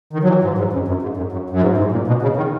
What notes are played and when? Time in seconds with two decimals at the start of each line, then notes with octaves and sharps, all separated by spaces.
0.13 D#3
0.23 F#3
0.28 E3
0.44 G#2
0.58 G#2
0.73 F#2
0.88 F#2
1.02 G#2
1.17 F#2
1.32 F#2
1.50 F#2
1.62 G#2
1.78 G#2
1.92 A#2
2.07 B2
2.22 C#3
2.37 D#3